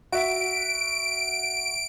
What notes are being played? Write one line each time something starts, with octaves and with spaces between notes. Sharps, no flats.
F#4 E5 D7